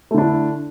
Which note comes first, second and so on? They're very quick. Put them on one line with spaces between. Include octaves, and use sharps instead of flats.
A3 D3 D4 E4